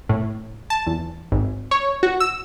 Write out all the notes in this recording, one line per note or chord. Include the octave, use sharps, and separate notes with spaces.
A2
A5
E2
G#1
C#5
F#4
E6